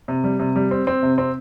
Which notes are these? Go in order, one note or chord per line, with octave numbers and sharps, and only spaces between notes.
C3
G3
C3
G3
C4
C4
C3
C4